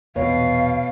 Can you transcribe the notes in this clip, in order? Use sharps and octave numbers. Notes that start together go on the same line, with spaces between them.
E1 A#1 E2 B2 C#5 F5